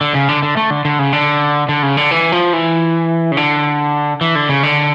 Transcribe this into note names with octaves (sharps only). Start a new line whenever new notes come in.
D3
C#3
D3
D3
A3
D3
D3
C#3
D3
D3
C#3
D3
E3
F3
E3
C#3
D3
E3
D3
C#3
D3